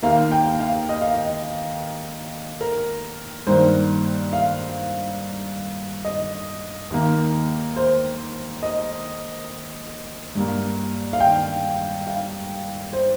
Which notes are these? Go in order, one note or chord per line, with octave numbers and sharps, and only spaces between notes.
D#2 D#3 A#3 F5
G5
F5
D#5
F5
D#5
A#4
G2 D#3 A#3 C5
F5
D#5
D#2 D#3 A#3
C5
D#5
G2 G3 A#3
F5
G5
F5
C5